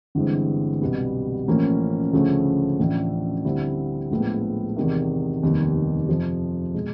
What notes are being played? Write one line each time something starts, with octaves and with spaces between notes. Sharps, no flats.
G1 G2 E3 G#3 C4
C2 B2 G3 B3
A1 A2 F3 A#3 C#4
D2 C#3 F3 A3 C#4
A1 A2 F3 A3 D4
D2 D3 G3 C4 E4
A#1 A2 F3 G#3 B3
E2 C3 D#3
F1 D#2 D#3 G3 B3
F2 C3 F3
B2 G#3